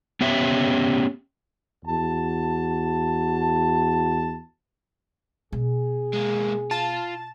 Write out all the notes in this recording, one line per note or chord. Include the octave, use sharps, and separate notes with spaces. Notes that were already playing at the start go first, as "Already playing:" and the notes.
B3 C#4 G4 E5
E2 F#4 A5
B2 G#4
G#3 A#3
F4 A5